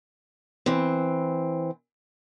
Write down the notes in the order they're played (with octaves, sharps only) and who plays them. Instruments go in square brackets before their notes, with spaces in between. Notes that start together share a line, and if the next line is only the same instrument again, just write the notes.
[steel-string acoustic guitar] E3 C4